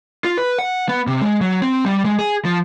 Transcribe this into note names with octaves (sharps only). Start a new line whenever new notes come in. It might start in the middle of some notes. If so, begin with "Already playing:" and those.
F4
B4
F#5
B3
C3
G#3
F#3
C4
G3
G#3
G#4
F3